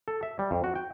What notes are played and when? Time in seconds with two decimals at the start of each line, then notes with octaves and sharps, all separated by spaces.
0.08 A4
0.23 E5
0.39 G3
0.51 F2
0.64 F#4
0.75 G5